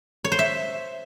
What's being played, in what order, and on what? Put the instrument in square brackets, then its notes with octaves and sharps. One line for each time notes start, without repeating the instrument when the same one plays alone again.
[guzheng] C#5
C5
E5